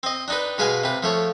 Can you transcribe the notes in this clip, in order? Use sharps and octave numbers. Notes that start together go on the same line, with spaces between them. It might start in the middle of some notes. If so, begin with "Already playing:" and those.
C4 D#5
D4 D#4 B4
B2 G#3 B4 F5 G#5
C3 B4
F3 A3 C#5